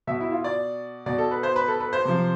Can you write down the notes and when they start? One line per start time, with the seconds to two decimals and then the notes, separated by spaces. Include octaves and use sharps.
0.07 B2 E5
0.21 E4
0.32 F4
0.44 D5
1.06 B2 D5
1.18 A4
1.31 B4
1.43 C5
1.56 B4
1.68 A4
1.80 B4
1.93 C5
2.05 C3 F3